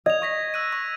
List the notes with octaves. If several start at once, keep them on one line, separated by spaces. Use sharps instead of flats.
D#5 G#6 F7
C#6 A#6 B6
E6 F#6 D#7
C#6